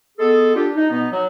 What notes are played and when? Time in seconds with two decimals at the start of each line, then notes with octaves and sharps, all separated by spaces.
0.18 G#3 B3 G#4 A4
0.55 D4 F4 G4
0.75 D#4
0.90 B2 B3 D#4
1.11 F#3